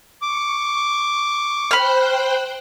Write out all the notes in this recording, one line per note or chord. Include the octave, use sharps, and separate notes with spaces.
C#6 D6
C5 G5 B5 F6 F#6